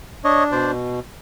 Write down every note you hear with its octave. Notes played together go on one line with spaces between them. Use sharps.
D4 C#5 D#5
B2 C5 D5